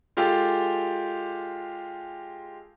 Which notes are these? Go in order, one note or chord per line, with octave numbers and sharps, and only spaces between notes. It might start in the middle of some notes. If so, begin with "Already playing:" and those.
G#3 F4 G4 A4